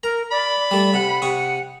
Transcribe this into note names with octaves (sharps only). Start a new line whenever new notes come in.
A#4 A#5
D5 B5
G3 A3
C3 F#5
C3 C#6 D#6